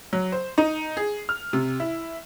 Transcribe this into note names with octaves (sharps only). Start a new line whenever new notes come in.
F#3
C5
D#4
G#4
F6
C3
E4